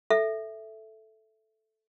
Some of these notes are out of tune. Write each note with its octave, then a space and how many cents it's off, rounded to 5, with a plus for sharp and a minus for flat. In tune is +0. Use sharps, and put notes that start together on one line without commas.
A4 -5 E5 +0